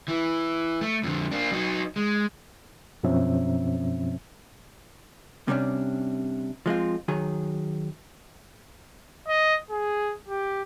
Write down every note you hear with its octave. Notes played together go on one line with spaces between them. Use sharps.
E3
A3
F2 D3
A#3 D4
F#3 D#4
G#3
F#2 B2 F3 C4 C#4 E5
C3 G3 C#4 D4
F3 G#3 C4 F4
D#3 F#3 G#4
D#5
G#4
G4